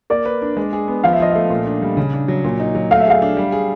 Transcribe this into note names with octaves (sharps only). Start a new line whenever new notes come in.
A#3 D5
B4
D4
G#3
G#4
B3
F3 F5
E5
F3 D#5
A3 E5
A#2
D4
G3
C#3
D4
F#3
A#2
D#4
F#3
A3 F5
E5
G#4 F5
D4
G3
G#4